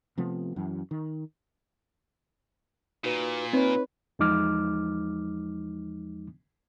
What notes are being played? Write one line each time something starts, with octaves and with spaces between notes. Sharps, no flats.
C3 F3 A3 B3
F#2 E3
D#3
A#2 D#4 F#4 B4
C4 D#4 B4 C#5 B5
E2 F3 G#3 D#4 D6 F6